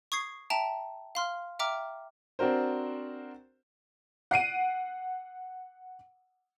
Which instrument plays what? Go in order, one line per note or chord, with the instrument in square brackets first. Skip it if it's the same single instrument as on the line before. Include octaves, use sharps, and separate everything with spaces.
[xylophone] C#6 D#6 G#6 C7
E5 G5 A5 A#5
F5 C6 F6
E5 G5 A#5 D6 F6
[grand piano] C4 D4 F#4 A#4 C5
[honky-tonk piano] F#5 C7 D7 D#7